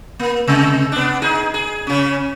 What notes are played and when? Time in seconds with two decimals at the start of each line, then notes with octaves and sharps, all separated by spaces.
0.19 A#3
0.47 C3 G#3
0.92 B3 D4
1.22 D#4 G#4
1.54 G#4
1.87 C#3 C#4